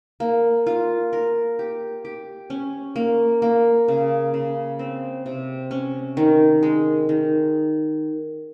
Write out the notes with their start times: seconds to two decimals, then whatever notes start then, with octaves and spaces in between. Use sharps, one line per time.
0.20 A#3
0.66 F4
1.13 A#4
1.59 G4
2.05 G4
2.50 C#4
2.96 A#3
3.42 A#3
3.88 C#3
4.34 C#3
4.79 C4
5.26 C3
5.71 C#4
6.17 D#3
6.63 G#3
7.09 D#3